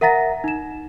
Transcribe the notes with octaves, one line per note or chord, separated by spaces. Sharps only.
A#4 E5 F#5 A#5 A6 A#6
D#4 E7